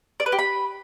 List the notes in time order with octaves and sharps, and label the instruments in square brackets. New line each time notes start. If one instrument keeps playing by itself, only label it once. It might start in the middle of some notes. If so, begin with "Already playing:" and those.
[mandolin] D5
B4
G4
B5